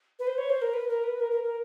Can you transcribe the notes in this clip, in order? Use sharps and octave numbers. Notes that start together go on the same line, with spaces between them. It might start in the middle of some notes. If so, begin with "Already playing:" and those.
B4
C5
C#5
C5
A#4
B4
A#4
B4
A#4
A#4
A#4